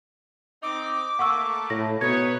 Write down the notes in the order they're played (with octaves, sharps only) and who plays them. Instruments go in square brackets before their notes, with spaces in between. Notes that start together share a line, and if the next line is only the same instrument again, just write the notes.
[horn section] C4 D#4 [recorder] D6
[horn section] A3 A#3 [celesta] F#5 C#6 E6
[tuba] A2 [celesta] A#6
[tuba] B2 [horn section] D#4 E4 C#5 [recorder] B4 [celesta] G#6